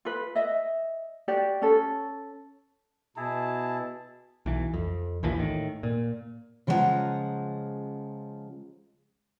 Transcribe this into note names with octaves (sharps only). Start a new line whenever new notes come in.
F4 B4
D#5 E5
F#4 G4 D5
C#4 A4
B2 E4 G#4 A5
B1 E3
F2
A#1 D#2 E3 F3
A2 D#3
A#2
C#3 F3 G#3 C5 F#5 A#5